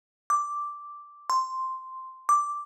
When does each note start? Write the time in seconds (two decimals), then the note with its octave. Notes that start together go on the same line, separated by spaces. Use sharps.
0.30 D6
1.30 C6
2.29 D6